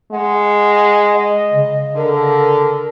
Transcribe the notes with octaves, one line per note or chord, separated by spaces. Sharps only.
G#3 F#5
D#5
C#3
D3 A#4